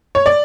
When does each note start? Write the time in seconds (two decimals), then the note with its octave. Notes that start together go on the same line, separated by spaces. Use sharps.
0.15 C#5
0.26 D5